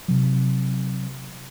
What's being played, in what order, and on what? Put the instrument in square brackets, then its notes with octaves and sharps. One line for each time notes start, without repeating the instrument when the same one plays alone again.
[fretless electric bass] C3 F#3